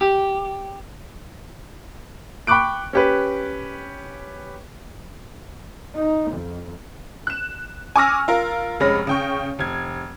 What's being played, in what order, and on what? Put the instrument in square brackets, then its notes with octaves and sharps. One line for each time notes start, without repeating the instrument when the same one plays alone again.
[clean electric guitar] G4
[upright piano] G5 B5 C#6 D6 F#6 D7
C#4 G4 B4
[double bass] D#4
F2
[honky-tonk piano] F#6 E7
G#5 C#6 D6 E6 F6 A#6
F4 A#4
F1 G#3 C#4 B5 F6 A#6
C#3 G5 C#6
F1 G#6